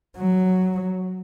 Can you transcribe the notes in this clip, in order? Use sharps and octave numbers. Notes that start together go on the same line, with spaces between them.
F#3